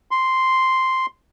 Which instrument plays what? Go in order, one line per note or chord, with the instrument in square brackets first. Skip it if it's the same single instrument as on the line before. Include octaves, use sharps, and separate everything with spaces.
[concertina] C6